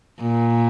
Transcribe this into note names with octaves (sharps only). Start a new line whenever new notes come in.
A#2